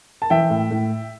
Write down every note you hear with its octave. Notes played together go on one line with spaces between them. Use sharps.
A5
E3 E5 G5
A2
A2